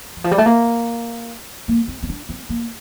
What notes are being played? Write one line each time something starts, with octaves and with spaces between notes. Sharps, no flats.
E3
F3
G3
A3
A#3
A#3
C4
C4
D4
C4
A#3